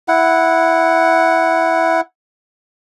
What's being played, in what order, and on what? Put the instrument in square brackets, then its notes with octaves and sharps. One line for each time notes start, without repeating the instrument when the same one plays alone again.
[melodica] E4 F#5